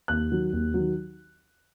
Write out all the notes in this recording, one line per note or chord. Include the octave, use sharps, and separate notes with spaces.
D#2 F#6
D#3 F#3
D#2
D#3 F#3